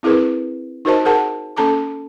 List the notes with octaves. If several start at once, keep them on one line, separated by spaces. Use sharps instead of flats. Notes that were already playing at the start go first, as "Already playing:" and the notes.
C4 E4 G#4 A#4 B4
D#4 F#4 A#4 C5 D#5 A5
G#4 A#4 F#5 A5
A#3 C#4 A4 A5 A#5 D6